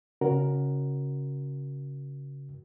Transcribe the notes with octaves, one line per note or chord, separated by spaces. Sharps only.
C#3 C#4 F#4 A#4